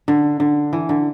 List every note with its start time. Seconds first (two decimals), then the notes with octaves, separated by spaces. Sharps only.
0.08 D3
0.40 D3
0.73 E3
0.89 D3